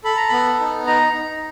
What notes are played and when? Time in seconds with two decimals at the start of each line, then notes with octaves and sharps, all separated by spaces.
0.04 A4 B5
0.17 A#5
0.29 B3 B5
0.60 D#4
0.87 D#4 A#5
1.14 D#4